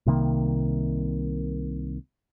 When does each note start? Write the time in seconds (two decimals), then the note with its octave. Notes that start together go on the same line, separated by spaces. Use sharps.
0.06 C2 C3 D#3 A#3